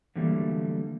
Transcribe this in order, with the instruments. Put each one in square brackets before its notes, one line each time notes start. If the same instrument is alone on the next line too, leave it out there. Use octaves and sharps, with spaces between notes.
[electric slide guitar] D3 E3 F#3 G3 A3 A#3